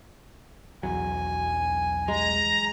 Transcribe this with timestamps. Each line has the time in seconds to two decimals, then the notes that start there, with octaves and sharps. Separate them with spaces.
0.83 B1 E2 F#3 G#5
2.08 G#3 A#5